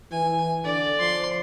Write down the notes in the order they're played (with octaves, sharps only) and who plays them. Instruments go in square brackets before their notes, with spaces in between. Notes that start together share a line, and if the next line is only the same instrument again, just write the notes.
[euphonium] E3 [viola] G#5
[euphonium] D3 [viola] D5
[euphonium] F3 [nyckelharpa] C6